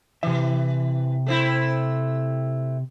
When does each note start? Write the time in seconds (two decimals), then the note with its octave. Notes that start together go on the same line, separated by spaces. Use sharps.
0.23 C3 E3 E5
1.26 A3 C4 E4